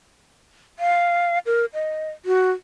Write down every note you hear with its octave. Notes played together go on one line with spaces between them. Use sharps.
F5
A#4
D#5
F#4